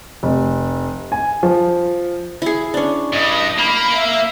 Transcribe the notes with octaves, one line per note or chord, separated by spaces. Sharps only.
F1
G#5
F3
E4 G#4
C#4 D4
G2 D#5
A#3 B5
E5